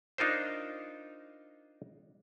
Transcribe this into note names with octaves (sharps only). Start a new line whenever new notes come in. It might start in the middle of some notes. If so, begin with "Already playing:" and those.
D4 D#4 F4 A#4 C5